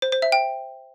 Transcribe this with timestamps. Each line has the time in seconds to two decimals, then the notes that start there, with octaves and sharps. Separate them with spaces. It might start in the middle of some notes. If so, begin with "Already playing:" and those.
0.02 C5
0.12 C5
0.22 E5
0.32 G5